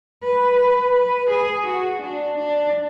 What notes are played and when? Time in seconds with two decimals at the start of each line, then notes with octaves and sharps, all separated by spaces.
0.23 B4
0.59 B4
0.94 B4
1.30 G#4
1.67 F#4
2.02 D4
2.38 D4